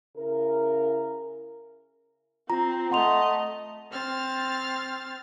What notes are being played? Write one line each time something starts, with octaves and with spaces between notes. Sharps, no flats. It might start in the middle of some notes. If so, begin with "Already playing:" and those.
C#3 E4 A#4
C4 F4 A#5
A3 D#5 F#5 C6 F7
C4 F6 A6